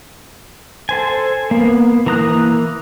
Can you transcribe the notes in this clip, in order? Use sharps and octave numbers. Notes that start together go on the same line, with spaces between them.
A4 C5 G#5
A#3 B3
E3 A#3 A#5 D#6 F#6